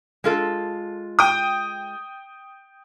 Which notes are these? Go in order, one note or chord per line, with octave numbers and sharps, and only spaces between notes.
G#3 F4 A4
G5 D#6